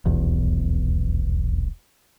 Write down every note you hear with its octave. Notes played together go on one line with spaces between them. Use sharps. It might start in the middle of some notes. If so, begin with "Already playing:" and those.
D#1 B1 E2